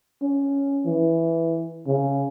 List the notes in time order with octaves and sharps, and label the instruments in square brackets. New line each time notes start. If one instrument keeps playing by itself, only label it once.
[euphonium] C#4
E3
C#3